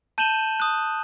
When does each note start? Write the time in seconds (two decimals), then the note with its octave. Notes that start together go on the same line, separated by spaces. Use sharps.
0.18 A5 G6 D#7 E7 F#7 G7
0.60 D#6 F#6